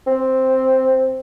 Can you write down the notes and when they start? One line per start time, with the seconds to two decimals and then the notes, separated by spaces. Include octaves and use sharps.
0.07 C4